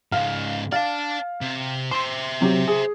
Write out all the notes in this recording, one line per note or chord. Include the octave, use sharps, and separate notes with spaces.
G#2 C#3 F5
D5 F5 A5
C3
C5 E5 C6
C3 F#3 G4
G#4